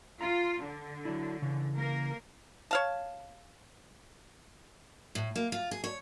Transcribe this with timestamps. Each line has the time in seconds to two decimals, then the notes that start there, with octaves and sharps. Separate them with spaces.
0.21 F4 A#5
0.61 D3
1.05 F#3 D4 E4
1.42 C#3 E3
1.75 A#3 A#4
2.71 C#5 F5 A5
5.15 A2
5.36 A#3
5.52 F4
5.71 G#4
5.84 C#5